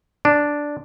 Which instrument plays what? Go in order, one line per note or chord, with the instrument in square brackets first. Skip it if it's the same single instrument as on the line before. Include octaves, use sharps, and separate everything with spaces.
[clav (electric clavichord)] D4